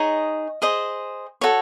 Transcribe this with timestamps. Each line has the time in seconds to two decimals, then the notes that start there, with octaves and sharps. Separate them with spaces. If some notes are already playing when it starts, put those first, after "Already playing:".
Already playing: D#4 G#4 C#5 D#5
0.62 G#4 C5 D#5
1.41 F#4 A4 C#5